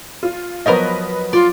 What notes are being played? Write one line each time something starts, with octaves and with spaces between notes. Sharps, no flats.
F4
F3 F#3 B3 A#4 B4 D#5
F4 D5